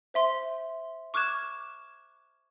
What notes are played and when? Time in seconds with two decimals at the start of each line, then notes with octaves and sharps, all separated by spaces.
0.14 C5 E5 C6
1.14 C#6 D6 F6 F#6 G#6 E7